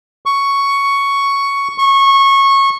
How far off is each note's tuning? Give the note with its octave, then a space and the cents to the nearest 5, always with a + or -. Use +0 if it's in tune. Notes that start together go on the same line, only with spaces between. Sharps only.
C#6 +5
C#6 -20